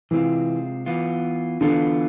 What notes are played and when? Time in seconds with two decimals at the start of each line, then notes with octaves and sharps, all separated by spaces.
0.11 C3 E3 G#3 C4 F4
0.86 E3 B3 F4
1.61 D3 E3 B3 F4